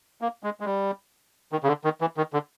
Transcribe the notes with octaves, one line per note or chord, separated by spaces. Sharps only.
A#3
G#3
G#3
G3
D#3
C#3
D3
D#3
E3
D#3
D3